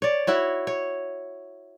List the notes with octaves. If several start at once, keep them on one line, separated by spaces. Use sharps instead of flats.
C#5 D5
E4 F#4 C#5
C#5